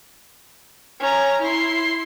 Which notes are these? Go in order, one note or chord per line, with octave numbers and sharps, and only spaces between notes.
C#4 A#5
E4 C6